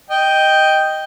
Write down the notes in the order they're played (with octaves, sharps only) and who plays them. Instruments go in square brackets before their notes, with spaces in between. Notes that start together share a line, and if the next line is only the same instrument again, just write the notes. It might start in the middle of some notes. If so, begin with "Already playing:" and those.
[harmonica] D#5 G5